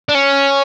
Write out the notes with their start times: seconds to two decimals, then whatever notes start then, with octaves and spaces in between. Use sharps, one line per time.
0.09 D4
0.15 C#4